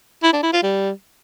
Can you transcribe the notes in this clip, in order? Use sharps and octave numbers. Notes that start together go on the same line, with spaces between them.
E4
D4
E4
F4
G3